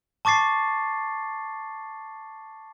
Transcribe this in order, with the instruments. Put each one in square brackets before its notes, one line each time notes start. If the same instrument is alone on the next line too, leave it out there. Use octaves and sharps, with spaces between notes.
[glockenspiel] A5 C#6 D6 A6 C7